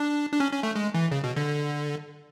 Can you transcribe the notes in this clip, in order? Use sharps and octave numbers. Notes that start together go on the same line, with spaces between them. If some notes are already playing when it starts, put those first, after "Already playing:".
Already playing: D4
D4
C#4
C#4
A3
G#3
E3
C#3
B2
D3